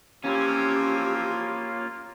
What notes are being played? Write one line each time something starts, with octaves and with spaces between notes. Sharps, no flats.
E3 F3 A#3 C4 C#4 F4 G4